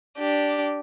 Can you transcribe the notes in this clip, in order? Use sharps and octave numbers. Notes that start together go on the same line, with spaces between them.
D4 G4